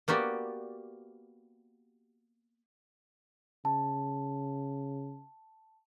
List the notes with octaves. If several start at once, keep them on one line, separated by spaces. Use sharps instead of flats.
A#3 B3 F#4 G4 D5
C#3 A5